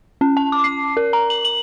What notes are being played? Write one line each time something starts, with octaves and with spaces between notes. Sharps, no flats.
C#4
A5
D6
C7
A#4
A#5
F#7
F#7